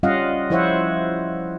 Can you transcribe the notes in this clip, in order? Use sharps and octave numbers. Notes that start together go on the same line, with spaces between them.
G3 C#4 F4 D#5 F5 F#5
F3 E4 C5 C#5 E5 F#5